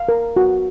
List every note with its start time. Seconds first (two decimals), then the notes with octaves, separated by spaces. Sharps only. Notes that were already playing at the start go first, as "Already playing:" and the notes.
Already playing: F5
0.09 A#4
0.36 F#4